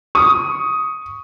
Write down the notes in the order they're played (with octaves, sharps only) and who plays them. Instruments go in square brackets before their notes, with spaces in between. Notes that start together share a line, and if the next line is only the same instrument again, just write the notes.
[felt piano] C#6 D#6